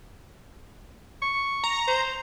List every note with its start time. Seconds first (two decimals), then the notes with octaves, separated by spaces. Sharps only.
1.22 C#6
1.64 A#5
1.88 C5